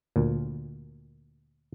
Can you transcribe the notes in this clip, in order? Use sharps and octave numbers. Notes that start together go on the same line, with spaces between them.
D2 A#2